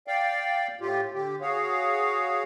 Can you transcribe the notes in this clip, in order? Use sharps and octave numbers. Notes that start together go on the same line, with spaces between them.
D5 F5 G5
A2 F4 G4
D3 G4
F#4 G#4 C#5 F5